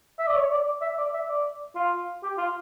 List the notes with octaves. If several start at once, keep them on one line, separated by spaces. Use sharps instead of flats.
E5
D5
C#5
D5
D5
E5
D5
E5
D5
F4
G4
F4